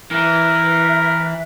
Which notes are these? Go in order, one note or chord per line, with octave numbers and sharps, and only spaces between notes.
E3 A#4 B4 E5 F#6